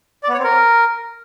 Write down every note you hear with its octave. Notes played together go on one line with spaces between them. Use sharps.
D5
B3
C#5
C4
A#4